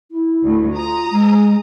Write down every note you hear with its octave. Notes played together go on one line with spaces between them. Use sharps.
E4
D2
F4 A#5 D#6
G#3